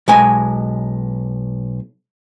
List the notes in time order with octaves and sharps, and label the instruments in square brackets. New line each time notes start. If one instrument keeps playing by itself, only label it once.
[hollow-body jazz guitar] B1 G#3 G#5